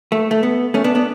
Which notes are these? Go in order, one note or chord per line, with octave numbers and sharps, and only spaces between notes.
A3
A3
B3
A3 C#4
B3 D4
B3 D4